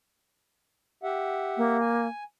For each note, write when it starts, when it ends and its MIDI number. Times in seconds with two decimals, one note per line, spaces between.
1.03 1.77 67
1.03 1.77 76
1.03 1.77 78
1.57 2.07 58
1.80 2.24 80